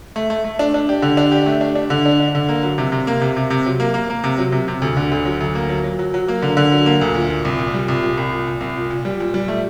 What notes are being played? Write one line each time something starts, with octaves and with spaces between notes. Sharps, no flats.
A3
A3
A3
D4
D4
G4
D3
D4
G4
A3
D4
D4
D3
D4
D4
D3
A#3
F#3
C3
C3
A#3
C3
C3
C3
F#3
A#3
A#3
A#3
C3
F#3
C3
C3
D2
D3
D2
F#3
D2
A#3
F#3
F#3
F#3
F#3
A#3
D3
D3
F#3
A#3
D2
A#2
A#2
C2
A#2
G3
C2
A#2
C2
A#2
A#2
C2
A#2
A#2
G3
A#2
G3
A3